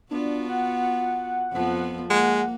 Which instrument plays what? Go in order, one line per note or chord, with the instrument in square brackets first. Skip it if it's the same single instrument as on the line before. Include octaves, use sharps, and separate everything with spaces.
[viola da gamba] B3 F4 F#4 [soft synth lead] D4
[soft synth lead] F#5
[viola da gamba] F2 F3 B3
[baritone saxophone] G#3 [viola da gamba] A#3 [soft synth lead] F#5